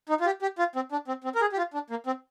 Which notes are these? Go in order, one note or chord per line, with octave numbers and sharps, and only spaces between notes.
D#4
F4
G4
G4
F4
C4
D4
C4
C4
A#4
G#4
G4
F4
D4
A#3
C4